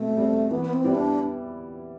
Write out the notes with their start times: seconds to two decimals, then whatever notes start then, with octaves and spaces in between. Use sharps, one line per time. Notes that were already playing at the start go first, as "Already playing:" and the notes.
Already playing: B2 A3 C4
0.17 G3 C4
0.51 E3 B3
0.65 B3
0.73 C4
0.84 G3 B3 E4 G4
0.95 D4